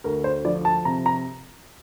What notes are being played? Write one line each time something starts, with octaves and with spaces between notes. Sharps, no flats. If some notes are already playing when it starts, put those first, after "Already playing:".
D2 A#4
C5
F3 D5
A5
C3 A#5
A#5